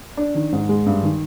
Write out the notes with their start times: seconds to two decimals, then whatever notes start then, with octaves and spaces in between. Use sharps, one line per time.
0.17 D4
0.35 D#3
0.52 G#2
0.69 G#3
0.86 G2
1.03 D#3